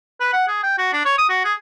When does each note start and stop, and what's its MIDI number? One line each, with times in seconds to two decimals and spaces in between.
0.20 0.30 71
0.33 0.43 78
0.48 0.63 68
0.63 0.77 79
0.78 0.90 66
0.93 1.05 62
1.05 1.15 73
1.18 1.30 87
1.30 1.42 66
1.45 1.54 68